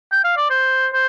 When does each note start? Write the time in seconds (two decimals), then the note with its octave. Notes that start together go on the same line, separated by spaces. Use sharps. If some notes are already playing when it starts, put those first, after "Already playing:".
0.12 G5
0.24 F5
0.37 D5
0.50 C5
0.93 C5